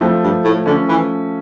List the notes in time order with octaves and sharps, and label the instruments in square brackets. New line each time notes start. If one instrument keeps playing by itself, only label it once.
[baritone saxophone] F2 [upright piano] F3 A3
[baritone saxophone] G2
A2
[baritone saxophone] D3 [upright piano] A3 C#4
[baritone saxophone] E3